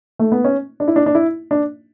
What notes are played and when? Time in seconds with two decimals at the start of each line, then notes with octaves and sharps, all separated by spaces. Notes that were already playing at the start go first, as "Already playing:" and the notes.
0.19 A3
0.32 B3
0.44 C#4
0.80 D4
0.88 E4
0.96 D4
1.06 D4
1.15 E4
1.51 D4